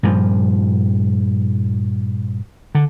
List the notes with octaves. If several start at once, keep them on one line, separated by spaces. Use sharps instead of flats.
G2 A#2 F3
D3